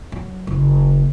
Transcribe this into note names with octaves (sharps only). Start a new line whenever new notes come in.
F#3
F#1